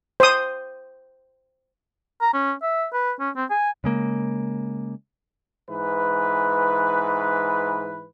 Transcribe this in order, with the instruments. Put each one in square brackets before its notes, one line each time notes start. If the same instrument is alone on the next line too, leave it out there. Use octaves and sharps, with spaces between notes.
[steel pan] C5 D#6
[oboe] A#5
C#4
E5
B4
C#4
C4
G#5
[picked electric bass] C#3 G#3 A#3
[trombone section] G#2 E3 B4